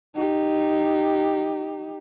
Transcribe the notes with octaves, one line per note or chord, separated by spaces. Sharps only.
D#4 G4